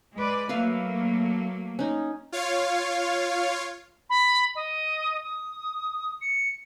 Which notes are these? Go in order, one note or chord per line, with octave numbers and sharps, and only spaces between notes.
G#3 B4 D5
F#3 A3 A#3 B4 E5 F5
C#4 D#4
F4 C#5 F5
B5
D#5
D#6
C#7